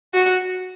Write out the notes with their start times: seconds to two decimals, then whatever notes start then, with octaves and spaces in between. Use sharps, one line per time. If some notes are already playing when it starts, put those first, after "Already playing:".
0.14 F#4